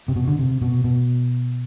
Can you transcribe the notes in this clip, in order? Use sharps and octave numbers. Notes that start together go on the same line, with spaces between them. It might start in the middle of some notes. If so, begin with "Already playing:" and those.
C3
B2
D3
C3
B2
B2